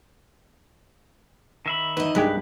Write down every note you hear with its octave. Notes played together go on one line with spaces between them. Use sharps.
D#3 E5 B5
E2 D#4 B4 D#5
C2 G2 G#3 G4 B4